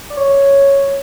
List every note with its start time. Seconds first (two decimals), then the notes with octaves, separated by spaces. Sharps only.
0.10 D5
0.17 C#5